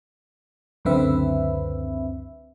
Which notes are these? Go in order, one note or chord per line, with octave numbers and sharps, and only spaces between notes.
C#2 F#2 D3 C4 B4 E5